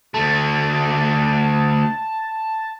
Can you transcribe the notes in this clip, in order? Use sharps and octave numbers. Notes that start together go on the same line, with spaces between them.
D2 A3 A5